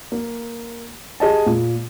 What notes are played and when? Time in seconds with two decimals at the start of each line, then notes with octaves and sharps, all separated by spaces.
0.12 A#3
1.20 G4 G#4 D#5 A5
1.46 A#2